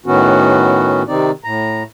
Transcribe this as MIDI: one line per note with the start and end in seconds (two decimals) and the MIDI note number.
0.06 1.03 45
0.06 1.03 51
0.06 1.03 59
0.06 1.03 61
0.06 1.03 66
1.08 1.31 48
1.08 1.31 51
1.08 1.31 60
1.08 1.31 63
1.08 1.31 74
1.44 1.83 45
1.44 1.83 82